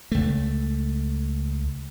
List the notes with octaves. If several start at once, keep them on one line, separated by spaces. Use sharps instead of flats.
C#2 A3